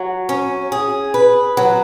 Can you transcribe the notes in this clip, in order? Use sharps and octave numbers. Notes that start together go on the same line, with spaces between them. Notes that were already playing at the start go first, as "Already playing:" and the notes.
Already playing: F#3
C#4
G#4
B4
F#3